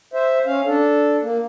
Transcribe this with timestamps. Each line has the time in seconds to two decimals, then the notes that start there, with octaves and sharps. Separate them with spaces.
0.13 C5 E5
0.45 C#4 F5
0.65 D4 A4
1.22 A#3